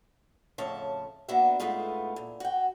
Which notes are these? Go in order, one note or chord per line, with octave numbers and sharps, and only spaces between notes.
F2 A2 C#3 C#4 E5 A5
A#3 B3 D4 F#4 E5
A2 G#3 A3 B3 D#4 F4
A#2
F#4 G5